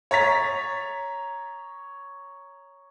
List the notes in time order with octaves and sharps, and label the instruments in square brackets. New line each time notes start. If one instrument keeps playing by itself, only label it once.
[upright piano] C#5 A#5 A6 B6